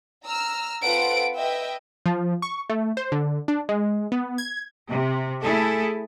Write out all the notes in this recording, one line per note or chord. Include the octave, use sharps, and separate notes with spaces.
A#5 E6 F6
C4 F4 A4 B4 F#5 D7
B4 D#5 E5 G5
F3
C#6
A3
C5
D3
D4
G#3
B3
G#6
C3
A3 E4 G#4 A4